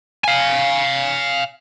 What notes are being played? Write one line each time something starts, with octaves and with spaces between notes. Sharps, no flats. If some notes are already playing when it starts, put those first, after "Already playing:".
F5 G#5